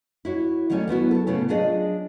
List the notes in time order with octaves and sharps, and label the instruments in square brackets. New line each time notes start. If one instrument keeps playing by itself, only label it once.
[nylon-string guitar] E4 F#4 C#5
D#3 F#3 A3 C#4 C#5 D5
F#3 B3 E4 F#4
E4 A4
A2 C#3 B3 C#4
F#3 D4 F4 G#4 D5 D#5